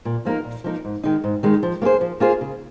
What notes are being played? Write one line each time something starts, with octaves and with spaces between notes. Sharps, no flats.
A#2
F3 A#3 D#4 A#4
A#2
F3 A#3 D#4 A#4
G#2
D#3 G#3 D#4
G#2
D#3 G#3 D#4
F3
A#3 F4 G#4 C5
F3
A#3 F4 G#4 C5
C#3